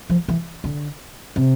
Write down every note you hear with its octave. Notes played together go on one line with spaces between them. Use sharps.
F3
E3
D3
C3